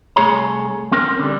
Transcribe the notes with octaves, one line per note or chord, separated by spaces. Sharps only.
C2 A2 A3 G#4 C#5 A#5
C4 C#4 A#4
D3 G3